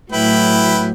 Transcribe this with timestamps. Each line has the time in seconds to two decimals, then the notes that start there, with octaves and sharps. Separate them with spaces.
0.12 A2 F#3 E4 B4 G5